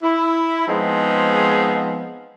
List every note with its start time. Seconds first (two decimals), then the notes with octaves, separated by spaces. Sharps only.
0.03 E4
0.68 F3 G#3 B3 C4 D#4 G#4